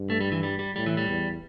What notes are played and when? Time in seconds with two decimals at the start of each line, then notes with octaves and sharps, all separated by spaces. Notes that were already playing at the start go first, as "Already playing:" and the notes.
Already playing: G2
0.10 A3
0.21 G3
0.32 E3
0.43 G3
0.59 G3
0.76 A2 G3
0.86 E3
0.97 G3
1.08 E2